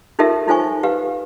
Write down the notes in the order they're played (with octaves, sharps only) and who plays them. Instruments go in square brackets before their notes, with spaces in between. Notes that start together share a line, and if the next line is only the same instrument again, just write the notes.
[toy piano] D#4 F4 G4 A4 A#4 E5
D#4 F4 A4 C5 G#5 C#6
G4 B4 F5